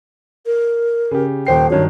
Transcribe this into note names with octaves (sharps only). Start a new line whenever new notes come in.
A#4
C#3 G4
D#1 C5 G5 C7
G2 D#3 F#3 C#5